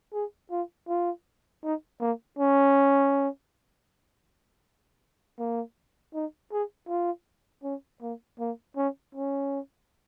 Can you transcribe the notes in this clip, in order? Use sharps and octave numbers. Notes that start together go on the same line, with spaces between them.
G#4
F4
F4
D#4
A#3
C#4
A#3
D#4
G#4
F4
C#4
A#3
A#3
C#4
C#4